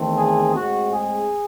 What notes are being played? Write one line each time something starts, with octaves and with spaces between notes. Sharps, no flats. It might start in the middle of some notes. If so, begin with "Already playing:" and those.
Already playing: E2 D#3 A3 C4
G#4
A2 G#3 C4 F#4
G#4